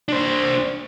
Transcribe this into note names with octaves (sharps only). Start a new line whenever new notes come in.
D4 C5